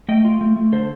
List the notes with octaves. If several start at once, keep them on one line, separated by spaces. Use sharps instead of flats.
A3 D#5 G5
F4
A3
A3
D3 A4 C5